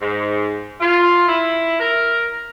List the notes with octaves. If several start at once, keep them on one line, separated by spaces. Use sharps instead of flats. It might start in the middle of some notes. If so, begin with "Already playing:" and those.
G#2
F4
E4
A#4